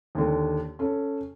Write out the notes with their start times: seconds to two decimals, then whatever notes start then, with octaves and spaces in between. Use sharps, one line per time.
0.15 D#2 D3
0.79 C#4 A4